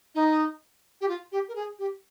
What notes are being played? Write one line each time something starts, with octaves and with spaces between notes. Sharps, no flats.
D#4
G4
F4
G4
A#4
G#4
G4